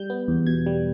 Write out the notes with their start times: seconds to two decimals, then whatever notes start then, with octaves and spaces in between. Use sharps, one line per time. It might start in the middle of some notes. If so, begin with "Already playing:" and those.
Already playing: G3 G6
0.10 B3
0.28 E2
0.47 B2 G#6
0.66 G3